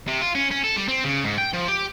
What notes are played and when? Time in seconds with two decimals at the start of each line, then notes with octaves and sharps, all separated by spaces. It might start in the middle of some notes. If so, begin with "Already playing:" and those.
0.08 C3
0.21 F4
0.35 C#4
0.51 C#4
0.64 A4
0.76 G3
0.88 C4
1.04 C#3
1.24 G#2
1.38 G5
1.53 F3
1.68 G4